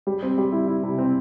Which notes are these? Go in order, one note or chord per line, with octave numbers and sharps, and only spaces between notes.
G3
C4
G3
E4
E4
C3
C4